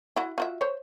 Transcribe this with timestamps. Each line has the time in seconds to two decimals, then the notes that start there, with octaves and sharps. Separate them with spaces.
0.16 E4 F#4
0.38 F4 F#4 E5
0.61 C5 C#5